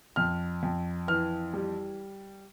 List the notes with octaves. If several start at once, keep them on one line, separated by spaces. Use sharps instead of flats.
F2 F6
F2
E3 F6
G3